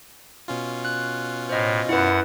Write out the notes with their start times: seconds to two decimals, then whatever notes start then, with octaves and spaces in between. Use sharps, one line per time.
0.48 B2 C#4 F4
0.85 F#6
1.49 A2 C5 D#5
1.89 F#2 E4 B4 F#5